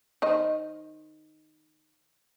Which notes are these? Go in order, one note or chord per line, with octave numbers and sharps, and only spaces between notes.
D#3 C5 D#5